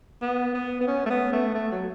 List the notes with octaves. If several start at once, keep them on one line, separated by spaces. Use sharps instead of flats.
B3
B3
B3
C#4
A3
B3
A3
A3
F#3